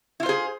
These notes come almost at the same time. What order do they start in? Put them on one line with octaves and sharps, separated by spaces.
E4 F4 C5 G#4